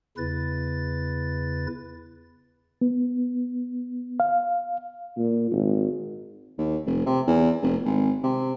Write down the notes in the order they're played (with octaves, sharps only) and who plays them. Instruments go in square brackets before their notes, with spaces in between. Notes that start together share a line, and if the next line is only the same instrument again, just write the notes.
[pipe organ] E2 C#3 E4 B4 A6
[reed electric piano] B3
F5
[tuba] A#2
G#1
[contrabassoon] D#2
F1
C3
E2
F1
G#1
C3